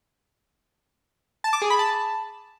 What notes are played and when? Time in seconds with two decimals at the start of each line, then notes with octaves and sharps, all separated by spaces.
1.44 A5
1.53 D6
1.62 G#4
1.70 B5
1.79 A5